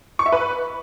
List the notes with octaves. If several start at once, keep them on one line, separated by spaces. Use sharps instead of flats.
C#6
E5
B4